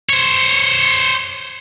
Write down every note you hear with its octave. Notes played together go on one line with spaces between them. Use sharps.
C5 C#5